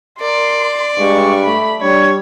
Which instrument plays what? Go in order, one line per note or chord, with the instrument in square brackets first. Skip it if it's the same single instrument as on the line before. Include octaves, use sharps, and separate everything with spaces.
[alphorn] A#4 [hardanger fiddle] D5 [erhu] C6
[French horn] G2 [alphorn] G#3 [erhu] C#6
[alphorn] A3 [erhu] B5
[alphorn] G3 [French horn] D4 [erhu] C#5